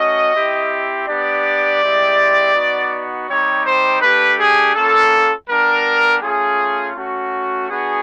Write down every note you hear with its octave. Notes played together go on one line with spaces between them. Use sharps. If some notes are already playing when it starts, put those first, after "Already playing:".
Already playing: A3 C#4 F#4 D#5
C4 E4 G4
B3 D4 G4 D5
G#3 C4 E4 G4
B3 D#4 F#4
G3 C4 D#4 G4 C#5
C5
A3 D4 G4 B4
G#4
A#3 C#4 F4 A4
G3 B3 D4 A#4
A3 C#4 F4 G#4
A3 C#4 F#4
B3 D4 F#4 G#4